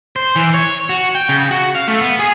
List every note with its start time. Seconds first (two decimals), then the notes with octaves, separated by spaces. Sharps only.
0.16 C5
0.36 E3
0.54 C#5
0.89 F#4
1.15 G5
1.29 C#3
1.51 F#4
1.75 F5
1.88 A3
2.01 B3
2.19 G#4